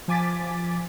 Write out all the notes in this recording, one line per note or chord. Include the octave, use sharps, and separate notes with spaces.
F3 G#5 D6 A6 B6